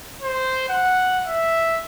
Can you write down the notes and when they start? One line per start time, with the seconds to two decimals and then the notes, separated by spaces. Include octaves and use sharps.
0.22 C5
0.69 F#5
1.25 E5